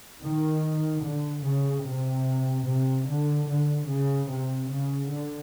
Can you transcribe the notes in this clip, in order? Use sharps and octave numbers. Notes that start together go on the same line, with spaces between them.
D#3
D3
C#3
C3
C3
D3
D3
C#3
C3
C#3
D3